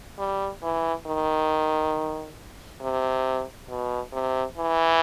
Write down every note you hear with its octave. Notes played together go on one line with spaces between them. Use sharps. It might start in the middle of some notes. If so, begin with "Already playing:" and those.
G3
E3
D#3
C3
B2
C3
E3